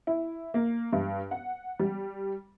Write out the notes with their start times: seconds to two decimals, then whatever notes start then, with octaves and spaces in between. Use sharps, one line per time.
0.07 E4
0.54 A#3
0.93 G2
1.31 F#5
1.80 G3